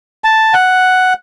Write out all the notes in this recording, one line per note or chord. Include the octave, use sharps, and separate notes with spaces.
A5
F#5